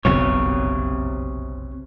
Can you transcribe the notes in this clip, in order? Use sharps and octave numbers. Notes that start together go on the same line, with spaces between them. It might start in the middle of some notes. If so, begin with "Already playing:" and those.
F#1 B1 F2 C3 C#5